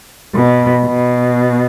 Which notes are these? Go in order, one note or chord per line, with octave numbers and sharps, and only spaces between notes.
B2
B2